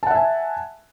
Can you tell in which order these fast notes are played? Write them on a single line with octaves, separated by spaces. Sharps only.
A5 F#5 E5 G#5